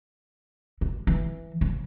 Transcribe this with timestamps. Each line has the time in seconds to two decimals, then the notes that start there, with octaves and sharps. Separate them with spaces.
0.81 G#3
1.07 E3
1.61 C#3